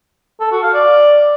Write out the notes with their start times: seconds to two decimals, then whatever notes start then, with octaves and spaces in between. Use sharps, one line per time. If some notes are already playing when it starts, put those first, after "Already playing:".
0.40 A4
0.51 F#4
0.63 F5
0.74 D5